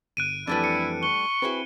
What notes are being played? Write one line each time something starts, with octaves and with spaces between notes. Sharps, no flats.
G1 F#6 D7 D#7
F2 E3 G3 A3 D4 E4
C#7
C#6 G7
C4 E4 F#4 G#4 B4